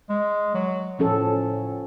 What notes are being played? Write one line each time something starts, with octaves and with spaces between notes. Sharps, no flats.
G#3
F#3
A2 F3 C#4 A4